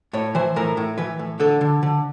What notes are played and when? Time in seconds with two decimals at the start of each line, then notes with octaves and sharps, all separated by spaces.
0.13 A2 C#5
0.35 E3 C5
0.56 A2 A#4
0.77 A2
0.98 E3 B4
1.19 A2
1.40 D3 A4
1.61 D3
1.83 D3